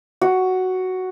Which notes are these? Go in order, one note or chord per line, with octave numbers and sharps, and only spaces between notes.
F#4